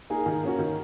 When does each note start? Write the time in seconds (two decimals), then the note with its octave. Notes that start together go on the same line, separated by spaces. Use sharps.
0.10 A#3 D#4 G#4
0.26 D#3
0.43 A#3 C#4 F#4
0.59 D#3